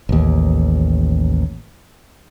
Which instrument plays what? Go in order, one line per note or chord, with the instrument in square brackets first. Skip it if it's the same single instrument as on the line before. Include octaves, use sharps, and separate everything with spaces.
[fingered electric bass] A1 D#2